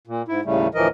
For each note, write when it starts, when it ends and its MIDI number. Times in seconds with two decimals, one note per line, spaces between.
0.07 0.22 46
0.28 0.41 44
0.28 0.41 64
0.45 0.68 39
0.45 0.68 45
0.45 0.68 49
0.45 0.68 55
0.45 0.68 57
0.74 0.88 38
0.74 0.88 45
0.74 0.88 52
0.74 0.88 53
0.74 0.88 70
0.74 0.88 75